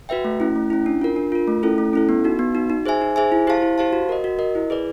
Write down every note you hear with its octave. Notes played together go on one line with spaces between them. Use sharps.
F#4 B4 E5 G5
A3
C#4 E4
A3
C#4 E4
D4
F4 A#4
D4
F4 A#4
A3
C#4 E4 A4
A3
C#4 E4 A4
B3
D#4 F#4
B3
D#4 F#4
D#4
G#4 C5 E5 G#5
D#4
G#4 C5 E5 G#5
E4
G4 C5 F5 A5
E4
G4 C5 F5 A5
F#4
A#4 D#5
F#4
A#4 D#5
E4
G#4 B4 D5